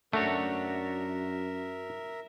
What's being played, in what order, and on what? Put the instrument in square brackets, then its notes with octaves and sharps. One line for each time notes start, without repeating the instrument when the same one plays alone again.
[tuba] F#2 [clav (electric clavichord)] A3 [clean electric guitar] D4 F#4 C#5 [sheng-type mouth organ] A#4 E5